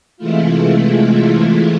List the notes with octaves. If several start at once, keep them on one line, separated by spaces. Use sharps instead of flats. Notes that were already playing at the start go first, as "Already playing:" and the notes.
C3 E3 G#3 A3 E4 F4